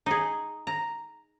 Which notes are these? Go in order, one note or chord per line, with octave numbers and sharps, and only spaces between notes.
D#4 G#4
A#5